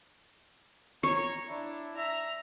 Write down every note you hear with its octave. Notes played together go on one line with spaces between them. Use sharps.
C#5 A#5 C#6
D4 E4
E5 A#5